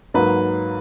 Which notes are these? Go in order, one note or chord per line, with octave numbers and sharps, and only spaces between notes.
G#2 F#3 A#3 B4